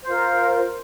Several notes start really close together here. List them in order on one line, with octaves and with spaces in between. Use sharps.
C5 F4 A#4